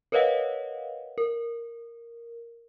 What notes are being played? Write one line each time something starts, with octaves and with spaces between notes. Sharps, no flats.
A#4 B4 C#5 D#5 F5 F#5
A#4